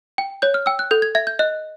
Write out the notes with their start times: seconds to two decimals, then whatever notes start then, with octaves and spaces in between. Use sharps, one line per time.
0.18 G5
0.42 C#5 G6
0.54 F6
0.66 G5 E6
0.79 F#6
0.91 A4 G6
1.02 G#6
1.15 E5 G#6
1.27 G6
1.39 D#5 F#6